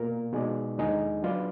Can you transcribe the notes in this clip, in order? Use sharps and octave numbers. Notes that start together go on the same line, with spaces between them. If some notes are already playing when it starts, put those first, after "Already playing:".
Already playing: B2 A#3 F4 A#4
B2 G#3 D#4 G#4 D5
D#2 D3 G#3 D#4 G#4
F#3 D4 F4 B4 D5